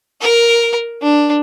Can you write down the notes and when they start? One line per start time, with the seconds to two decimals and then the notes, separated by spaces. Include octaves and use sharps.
0.22 A#4
1.02 D4